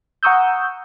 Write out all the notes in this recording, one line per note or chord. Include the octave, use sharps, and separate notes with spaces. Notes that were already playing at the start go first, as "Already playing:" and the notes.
F#5 A#5 C#6 D#6 E6 G6